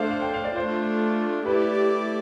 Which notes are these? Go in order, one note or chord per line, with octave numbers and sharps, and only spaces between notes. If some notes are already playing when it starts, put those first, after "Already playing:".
Already playing: A3 D4 A4 C5 E5 F5
F5
G5
F5
D5
A3 D4 F4 C5
A3 E4 G4 B4 D5